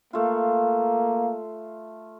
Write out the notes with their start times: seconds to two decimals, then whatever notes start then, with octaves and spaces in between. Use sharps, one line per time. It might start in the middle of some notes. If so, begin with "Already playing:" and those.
0.13 A3 A#3 F4